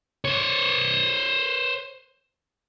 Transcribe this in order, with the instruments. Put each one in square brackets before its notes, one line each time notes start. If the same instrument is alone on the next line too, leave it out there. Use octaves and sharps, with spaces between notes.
[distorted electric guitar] C5 C#5